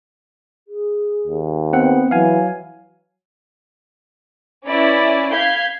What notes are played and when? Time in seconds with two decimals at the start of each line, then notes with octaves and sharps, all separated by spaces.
0.68 G#4
1.27 D#2
1.73 B3 C4 F#5
2.11 E3 F#3 F5 G#5
4.66 C#4 E4 B4 D5
5.32 F5 G6 G#6 B6 C7